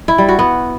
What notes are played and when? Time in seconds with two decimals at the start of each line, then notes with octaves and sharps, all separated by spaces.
0.08 E4
0.18 G3
0.29 F#4
0.39 B3